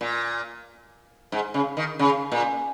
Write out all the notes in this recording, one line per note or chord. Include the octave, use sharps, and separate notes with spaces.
A#2
G#2
C#3
D#3
C#3
A#2